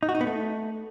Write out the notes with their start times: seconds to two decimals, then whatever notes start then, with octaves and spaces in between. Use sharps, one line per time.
0.03 D#4
0.09 F#4
0.15 D#4
0.21 B3
0.27 A3